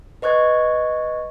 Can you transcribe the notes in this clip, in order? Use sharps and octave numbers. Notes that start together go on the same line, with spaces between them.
B4 D#5 C#6 F#6 G#6